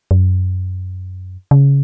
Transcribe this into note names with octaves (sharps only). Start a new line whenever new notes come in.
F#2
C#3